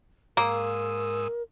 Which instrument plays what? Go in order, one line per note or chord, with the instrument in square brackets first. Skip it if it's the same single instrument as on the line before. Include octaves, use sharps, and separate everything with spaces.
[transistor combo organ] G#2 D#6 E6 [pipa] A#3 [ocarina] A#4